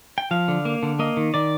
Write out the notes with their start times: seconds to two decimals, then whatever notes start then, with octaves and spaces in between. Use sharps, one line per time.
0.18 G5
0.31 F3 F5
0.48 D3
0.65 A#3
0.83 D3
0.99 A#3 D#5
1.17 D#3
1.34 D#3 D5